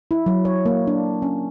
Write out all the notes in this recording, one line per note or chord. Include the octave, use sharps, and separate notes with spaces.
E4
F#3
C#5
A#3
D4
C#4